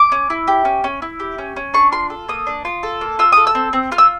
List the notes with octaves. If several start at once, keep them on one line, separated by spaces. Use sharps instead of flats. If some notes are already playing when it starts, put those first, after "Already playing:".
Already playing: D6
C#4
E4
G4
C#4
C#4
E4
G4
C#4
C#4
D4 C#6
F4 C6
A4
A#3 D#6
D4
F4
A4
A#3
F4 E6
A4 D#6
E6
C4
C4
F4 F6
E6